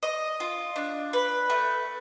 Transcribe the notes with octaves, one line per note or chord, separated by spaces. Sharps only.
D#5
F4
D4
B4
A3